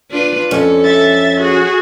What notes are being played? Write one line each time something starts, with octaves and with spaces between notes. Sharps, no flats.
D4 F4 B4
F2 C#4 A4
E5 A6
F#4 G#4